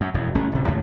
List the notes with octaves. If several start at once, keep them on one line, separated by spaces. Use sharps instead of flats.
F#2
E1 F2
F#1 A3 C#4
D1 C3
D#2 A2 C#3